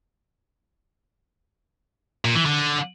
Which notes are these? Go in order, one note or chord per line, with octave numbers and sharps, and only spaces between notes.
A#2
E3
D3